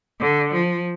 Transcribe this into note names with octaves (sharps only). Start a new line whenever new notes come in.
D3
F3